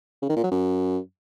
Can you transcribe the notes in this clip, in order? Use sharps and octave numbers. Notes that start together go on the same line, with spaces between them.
C#3
D#3
A#2
F#3
F#2